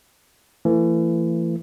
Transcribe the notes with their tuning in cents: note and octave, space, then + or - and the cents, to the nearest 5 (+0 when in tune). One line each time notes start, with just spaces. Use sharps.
E3 +30 A3 +40